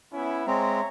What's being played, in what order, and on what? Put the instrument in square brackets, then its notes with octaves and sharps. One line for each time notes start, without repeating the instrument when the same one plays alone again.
[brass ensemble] B3 C#4 E4
[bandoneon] G#3 C4 [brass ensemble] C#5 E5 A#5